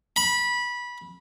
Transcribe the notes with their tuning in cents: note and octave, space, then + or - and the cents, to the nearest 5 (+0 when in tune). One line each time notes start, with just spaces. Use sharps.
B5 -20